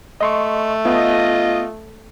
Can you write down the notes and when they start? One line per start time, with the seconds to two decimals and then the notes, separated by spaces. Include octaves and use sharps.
0.21 A3 D#5 C6 C#6
0.86 B3 F4 D#5